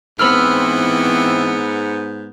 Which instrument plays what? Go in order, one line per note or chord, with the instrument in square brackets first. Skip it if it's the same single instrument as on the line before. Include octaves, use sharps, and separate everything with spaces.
[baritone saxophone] G#2 [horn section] E3 C4 [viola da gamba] B3 [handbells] B5 E6 F6